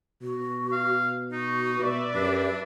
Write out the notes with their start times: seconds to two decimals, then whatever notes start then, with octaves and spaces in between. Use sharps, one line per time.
0.22 B2 F#4
0.72 F5
1.31 D#4 F#4
1.79 B2 B4 D5 E5
2.15 F#2 D4 G4